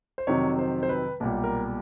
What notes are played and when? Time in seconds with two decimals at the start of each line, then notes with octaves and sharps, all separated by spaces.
0.18 C5
0.27 F2 C3 D#3 F#3 C#5
0.59 C5
0.83 C5
0.89 B4
1.20 B1 A#2 G3
1.44 A#4